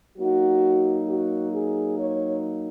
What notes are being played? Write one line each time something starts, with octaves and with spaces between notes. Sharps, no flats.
F#3 A#3 D#4 F#4
F#4
G#4
C#5